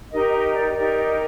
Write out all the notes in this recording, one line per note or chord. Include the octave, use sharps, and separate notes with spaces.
D#4 G4 A#4 D#5
D#5
D5
D#4 G4 A#4 D5
D#5